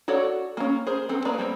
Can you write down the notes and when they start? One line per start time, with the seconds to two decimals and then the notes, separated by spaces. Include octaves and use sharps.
0.08 F#4 A4 C#5 D5 F#5
0.57 A#3 C#4
0.87 G#4 A#4 C5
1.09 B3 C4 A4
1.25 A#3 G#4 A#4 B4 D5
1.38 G3 A#3 C4